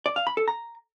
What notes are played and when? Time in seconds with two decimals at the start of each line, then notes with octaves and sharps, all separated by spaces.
0.06 D5
0.16 F5
0.27 B5
0.37 A4
0.48 A#5